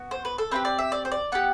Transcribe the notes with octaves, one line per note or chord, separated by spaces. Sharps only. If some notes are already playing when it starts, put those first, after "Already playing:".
Already playing: B3 F#4
C5
B4
A4
C4 E4 G4 B4
D5
E5
D5
C5
D5
B3 E4 G4 F#5